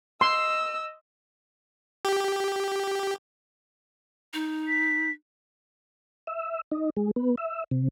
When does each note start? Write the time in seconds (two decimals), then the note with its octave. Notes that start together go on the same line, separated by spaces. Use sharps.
0.21 D#5 C6 E6
2.05 G4
4.33 D#4
4.68 B6
6.27 E5
6.72 D#4
6.97 G#3
7.16 B3
7.38 E5
7.71 C3